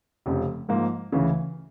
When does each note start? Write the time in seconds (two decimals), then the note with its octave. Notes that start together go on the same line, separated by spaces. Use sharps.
0.26 F1 F2 C#3 F3
0.69 G#2 F3 A#3
1.12 D2 C#3 E3